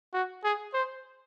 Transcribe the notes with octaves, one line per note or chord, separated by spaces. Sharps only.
F#4
G#4
C5